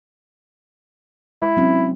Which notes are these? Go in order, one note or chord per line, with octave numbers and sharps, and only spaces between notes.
G#3 E4
F#3 C4 C#4